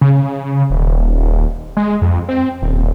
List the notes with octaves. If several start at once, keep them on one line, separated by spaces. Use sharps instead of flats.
C#3
D#1
G#3
F2
C4
D#1